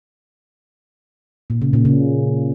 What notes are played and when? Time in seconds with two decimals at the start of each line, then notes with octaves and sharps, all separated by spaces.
1.50 A#2
1.62 C#3
1.73 A#2
1.85 C#3